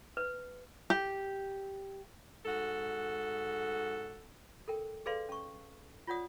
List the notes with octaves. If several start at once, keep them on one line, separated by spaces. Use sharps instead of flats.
B4
G4
G#2 F#4 A4
A4 A#4 G5
G#4 A4 B4 D5 F5 C6
C#4 C#6
F4 C#5 D5 F#5 D#6